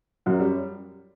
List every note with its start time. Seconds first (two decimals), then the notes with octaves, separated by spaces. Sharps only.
0.26 F#2 F#3 C#4
0.40 G3